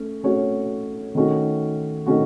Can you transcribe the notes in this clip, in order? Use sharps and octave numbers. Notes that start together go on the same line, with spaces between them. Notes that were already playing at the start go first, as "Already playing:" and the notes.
Already playing: A3 C#4
A3 C#4 F#4 C#5
D#3 A3 C#4 F#4
D#3 A3 C#4 F#4